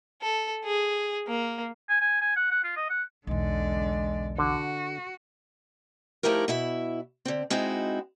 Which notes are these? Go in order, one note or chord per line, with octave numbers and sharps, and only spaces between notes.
A4
G#4
A#3
G#5
G#5
G#5
F#5
F#5
F4
D#5
F#5
B1 E2 D3 G#3 D5
D3 F#4
F3 A3 D#4 E4 G4 A#4
B2 E4 E5
D3 C4
G#3 C4 D#4 E4 F#4